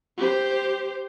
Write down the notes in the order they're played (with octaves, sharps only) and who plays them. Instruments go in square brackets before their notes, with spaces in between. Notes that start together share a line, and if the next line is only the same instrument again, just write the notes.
[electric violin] G4 C5